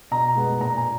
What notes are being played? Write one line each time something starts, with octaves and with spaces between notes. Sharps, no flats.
B2 A#5
G#3 B3
A#2 A#5
G#5